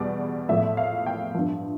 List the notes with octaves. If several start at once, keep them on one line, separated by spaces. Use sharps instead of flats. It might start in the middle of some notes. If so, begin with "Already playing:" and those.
Already playing: E2 B2 G3 D5
A2 F3 E5
F5
G5
G2 F3